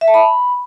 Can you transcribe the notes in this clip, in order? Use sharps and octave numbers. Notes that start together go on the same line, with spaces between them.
E5
A5
B5